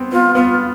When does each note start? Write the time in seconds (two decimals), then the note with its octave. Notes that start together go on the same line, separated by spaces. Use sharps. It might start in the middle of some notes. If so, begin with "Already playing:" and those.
Already playing: B3 C4
0.12 B3 F4
0.35 B3 F4